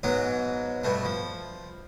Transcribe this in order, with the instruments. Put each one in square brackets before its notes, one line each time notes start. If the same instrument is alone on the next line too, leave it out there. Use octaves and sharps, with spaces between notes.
[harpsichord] G#2 F#3 B3
G2 B2 A3
F3